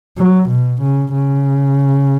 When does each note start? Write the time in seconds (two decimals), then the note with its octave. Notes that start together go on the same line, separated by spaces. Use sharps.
0.18 F#3
0.50 B2
0.82 C#3
1.13 C#3